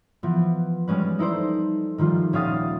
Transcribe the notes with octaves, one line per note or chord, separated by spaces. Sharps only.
E3 F3 B3
G3 G#3 C#4 B4
D#4 E4 A4 C5 D5
D#3 F3 G3 F4
D#1 C#4 G4 F5 D#6 A6